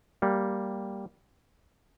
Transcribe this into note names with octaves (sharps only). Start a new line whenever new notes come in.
G3 A#3